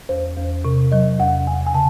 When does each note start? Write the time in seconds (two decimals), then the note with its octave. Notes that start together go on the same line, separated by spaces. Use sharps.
0.09 E2 C5
0.37 E2
0.65 C3
0.92 F#3 D#5
1.19 E2 F#5
1.47 E2 G#5
1.67 G#5
1.74 C#3 A5